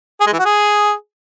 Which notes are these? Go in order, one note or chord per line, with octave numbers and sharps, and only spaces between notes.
G#4
G#3
E3
F#4
G#4